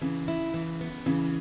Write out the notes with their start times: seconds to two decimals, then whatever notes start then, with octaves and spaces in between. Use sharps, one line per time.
0.02 C#3 E3
0.28 E4
0.54 E3
0.81 B3
1.06 C#3 E3